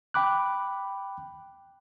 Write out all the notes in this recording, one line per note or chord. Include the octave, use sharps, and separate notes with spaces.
G5 B5 D6 F#6